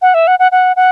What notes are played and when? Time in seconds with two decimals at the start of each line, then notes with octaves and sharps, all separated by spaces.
0.02 F#5
0.14 E5
0.27 F#5
0.39 F#5
0.52 F#5
0.76 F#5